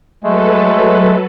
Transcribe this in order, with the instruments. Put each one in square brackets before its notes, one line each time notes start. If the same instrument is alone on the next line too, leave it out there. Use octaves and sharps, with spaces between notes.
[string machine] F#3 A4 B4 [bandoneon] G#3 A3